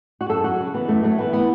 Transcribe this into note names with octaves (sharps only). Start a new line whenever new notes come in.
F#4
F#2 A4
F#3 F#4
C#3
E3 B3
F#2 A3
F#3 A3
E3 B3
B3